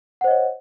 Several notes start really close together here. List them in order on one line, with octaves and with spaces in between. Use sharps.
F#5 C5 D#5 C#5